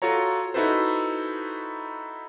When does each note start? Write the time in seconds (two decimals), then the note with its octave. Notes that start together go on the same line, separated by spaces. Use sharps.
0.02 F4 F#4 A4 C#5 A#5
0.54 D#4 E4 F#4 A4 B4 C5